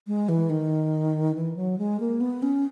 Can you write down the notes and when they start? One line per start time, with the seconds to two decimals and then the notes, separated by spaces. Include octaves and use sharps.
0.07 G#3
0.29 E3
0.50 D#3
1.35 E3
1.56 F#3
1.78 G#3
2.00 A#3
2.21 B3
2.43 C#4